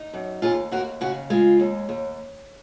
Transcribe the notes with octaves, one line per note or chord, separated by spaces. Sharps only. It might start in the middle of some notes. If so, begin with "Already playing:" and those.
Already playing: D#4
F#2
D#2 F4 G#4
D#2 F#4 A#4
C#3 F#4
G#3 F4
D#2
D#2